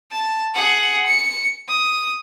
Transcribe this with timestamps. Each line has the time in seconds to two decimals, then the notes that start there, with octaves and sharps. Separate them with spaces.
0.12 A5
0.54 G#4 F#5
1.06 C#7
1.68 D#6